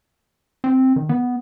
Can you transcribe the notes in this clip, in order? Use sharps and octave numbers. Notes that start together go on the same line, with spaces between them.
C4
D#3
B3